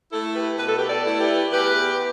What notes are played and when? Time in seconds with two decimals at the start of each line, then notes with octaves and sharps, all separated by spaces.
0.12 A3 E4 A4
0.35 G4 B4
0.59 B2 B4
0.68 A4
0.79 G4 B4
0.89 A4 D5
1.05 A3 E4
1.20 G4 B4
1.52 E2 G4 B4